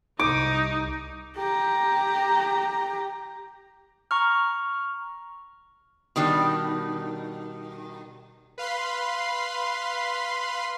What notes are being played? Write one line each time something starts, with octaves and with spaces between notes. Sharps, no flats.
C2 D#4 D6
G4 A#5
A#5 C#6 F6
B2 D#3 G3 D4
B4 F5 B5 C6